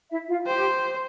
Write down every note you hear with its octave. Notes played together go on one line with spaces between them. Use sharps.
E4 E5
F4 F5
G4 C5 G5